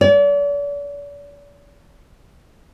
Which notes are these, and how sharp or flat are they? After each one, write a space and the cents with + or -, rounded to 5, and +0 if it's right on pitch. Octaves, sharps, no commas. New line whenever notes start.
D5 -40